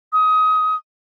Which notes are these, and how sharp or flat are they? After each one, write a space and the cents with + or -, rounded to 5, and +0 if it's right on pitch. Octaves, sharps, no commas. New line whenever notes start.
D#6 +20